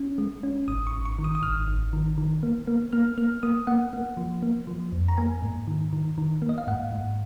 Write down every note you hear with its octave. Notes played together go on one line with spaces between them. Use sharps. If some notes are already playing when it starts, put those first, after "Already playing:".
Already playing: C#4
G#3
C#4
G#1 D#6
C#6
G#1
C#6
D#3
D#6
D#6
G#1 F6
G#1
D#3
D#3
A#3
A#3
A#3 F6
A#3 F6
A#3 D#6
A#3 F#5
A#3
F3
A#3
F3
F2
A#5
A#3 G#5
G#2
D#3
D#3
D#3
A#3
D#5
F5
G#2 F#5
G#2